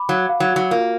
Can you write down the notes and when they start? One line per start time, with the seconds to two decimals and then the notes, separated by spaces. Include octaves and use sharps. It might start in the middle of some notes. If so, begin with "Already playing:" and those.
Already playing: B5 D6
0.09 F#3 F5
0.29 F5
0.40 F#3
0.50 F#4
0.56 F#3
0.71 A#3 F4